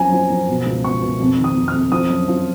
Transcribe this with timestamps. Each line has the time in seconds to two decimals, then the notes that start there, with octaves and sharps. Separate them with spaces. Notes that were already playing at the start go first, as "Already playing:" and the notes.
Already playing: F#2 F3 G#5 A#5
0.12 F3
0.30 F3
0.48 B2
0.66 C#2
0.84 B2 C#6
1.02 B2
1.20 F2
1.38 D#3
1.44 D#6
1.56 F2
1.68 F6
1.74 F2
1.92 F3 D#6
2.10 F#2
2.28 F3